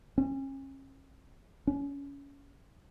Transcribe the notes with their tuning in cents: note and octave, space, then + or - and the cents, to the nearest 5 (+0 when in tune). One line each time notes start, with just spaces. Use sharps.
C#4 -35
C#4 +20